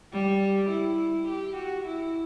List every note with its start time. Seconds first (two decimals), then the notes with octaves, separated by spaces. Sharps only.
0.13 G3
0.70 E4
1.28 G4
1.57 F#4
1.86 E4